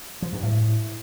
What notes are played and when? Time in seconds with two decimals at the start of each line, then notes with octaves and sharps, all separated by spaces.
0.22 F3
0.33 G2
0.43 A2